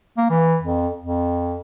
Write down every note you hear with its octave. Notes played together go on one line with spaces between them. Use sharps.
A#3
E3
F2
F2